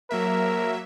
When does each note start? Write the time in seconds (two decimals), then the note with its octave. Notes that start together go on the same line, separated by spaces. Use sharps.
0.11 F#3 A#3 A#4 E5